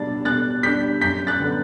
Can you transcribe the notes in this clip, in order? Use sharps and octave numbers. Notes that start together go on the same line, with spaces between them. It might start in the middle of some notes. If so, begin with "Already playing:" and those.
Already playing: B2 G3 D4 A6
B2 F#6 A6
G3 D4 G6 B6
F#2 G6 B6
F#6 A6
D3 G3 B3